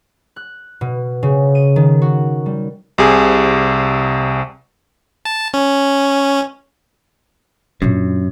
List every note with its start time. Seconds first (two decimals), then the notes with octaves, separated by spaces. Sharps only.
0.36 F#6
0.81 B2
1.23 C#3
1.55 D#7
1.76 D#3
2.02 F#4
2.46 G3
2.98 C2 C3 G#4
5.25 A5
5.54 C#4
7.82 F#2 A#2 D4